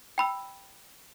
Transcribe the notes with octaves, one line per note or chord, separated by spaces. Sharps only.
G5 B5 E6